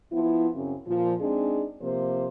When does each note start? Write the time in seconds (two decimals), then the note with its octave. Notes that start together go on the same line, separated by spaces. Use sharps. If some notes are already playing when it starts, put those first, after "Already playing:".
0.12 F3 B3 E4
0.54 F#2 C#3 C4
0.87 A#2 F3
1.20 G#3 C4 D4 D#4 G#4
1.81 C3 F3 A#3 C5